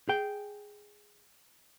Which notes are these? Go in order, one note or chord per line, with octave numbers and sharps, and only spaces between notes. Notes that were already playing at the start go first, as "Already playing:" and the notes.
G#4 G5